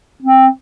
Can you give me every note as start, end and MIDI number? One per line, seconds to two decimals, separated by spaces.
0.23 0.47 60